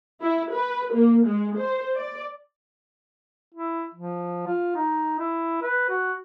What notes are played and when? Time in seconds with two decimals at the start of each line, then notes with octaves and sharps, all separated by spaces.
0.22 E4
0.53 B4
0.93 A#3
1.26 G#3
1.59 C5
1.96 D5
3.54 E4
3.94 F3
4.47 F4
4.75 D#4
5.19 E4
5.62 B4
5.90 F#4